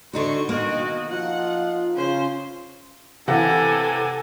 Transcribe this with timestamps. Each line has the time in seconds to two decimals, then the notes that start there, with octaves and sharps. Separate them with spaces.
0.13 D3 D#4 F#4 C5 C#6
0.49 B2 D#3 A#3 F#4 D#5
1.09 F3 D#4 F4 F#5
1.95 C#3 C#4 F4 C5
3.28 C3 E3 A4 F#5 G#5